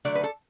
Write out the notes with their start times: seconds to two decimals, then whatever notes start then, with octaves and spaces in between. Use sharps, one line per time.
0.05 D3 F#3 A3 D5
0.15 B4
0.23 A4